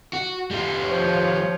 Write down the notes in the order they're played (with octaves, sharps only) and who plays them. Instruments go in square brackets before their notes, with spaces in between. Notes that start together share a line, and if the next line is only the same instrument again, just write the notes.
[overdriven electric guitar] F#4
G3 F4
[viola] F3 C#5